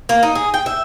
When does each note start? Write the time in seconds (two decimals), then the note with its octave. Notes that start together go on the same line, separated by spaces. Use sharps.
0.09 A#3
0.23 D#4
0.35 G#4
0.54 G5
0.66 E5